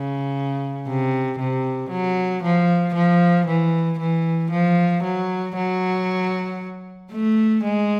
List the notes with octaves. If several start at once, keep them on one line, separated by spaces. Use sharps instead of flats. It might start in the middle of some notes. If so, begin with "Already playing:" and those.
Already playing: C#3
C3
C3
F#3
F3
F3
E3
E3
F3
F#3
F#3
A3
G#3